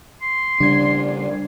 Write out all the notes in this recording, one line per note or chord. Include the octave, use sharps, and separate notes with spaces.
C6
C#3 G3 D4 D5 G#6